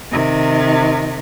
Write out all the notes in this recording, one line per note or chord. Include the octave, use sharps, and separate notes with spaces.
C3 D#3